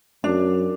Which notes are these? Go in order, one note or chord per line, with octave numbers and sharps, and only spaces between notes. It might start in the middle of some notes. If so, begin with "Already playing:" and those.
F#2 D4